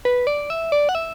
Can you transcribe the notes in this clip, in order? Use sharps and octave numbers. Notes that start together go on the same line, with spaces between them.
B4
D5
E5
D5
F#5
E5